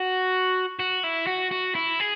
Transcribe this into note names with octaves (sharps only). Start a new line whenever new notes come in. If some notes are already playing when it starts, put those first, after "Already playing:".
Already playing: F#4
F#4
E4
F#4
F#4
E4
G#4